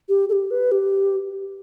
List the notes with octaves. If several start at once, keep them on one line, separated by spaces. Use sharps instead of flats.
G4
A4
G4
B4
G4